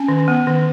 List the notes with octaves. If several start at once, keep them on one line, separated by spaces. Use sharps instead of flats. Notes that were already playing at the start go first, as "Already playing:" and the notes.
Already playing: C#4 G#5
D#3
B3
D#3